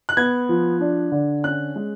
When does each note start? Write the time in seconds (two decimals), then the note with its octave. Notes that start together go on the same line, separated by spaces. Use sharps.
0.09 F#6
0.17 B3 G#6
0.49 F3
0.81 D4
1.12 D3
1.44 C#4 F#6
1.76 G#3